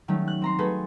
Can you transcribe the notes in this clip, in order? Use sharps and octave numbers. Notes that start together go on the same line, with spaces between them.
D#3 F#3 G3 A3 C#4
F#6
C4 A#5 C6
A3 F#4 G#4 A4 B4